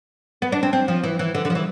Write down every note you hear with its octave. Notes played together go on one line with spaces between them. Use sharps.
B3
D4
C4
C4
F3
E3
E3
D3
D3
F3
E3